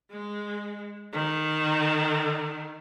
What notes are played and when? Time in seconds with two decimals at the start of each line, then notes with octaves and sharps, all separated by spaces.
0.11 G#3
1.13 D#3